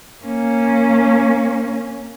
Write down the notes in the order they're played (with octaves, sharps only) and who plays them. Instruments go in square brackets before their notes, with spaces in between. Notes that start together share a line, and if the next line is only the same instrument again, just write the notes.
[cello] A#3 C#4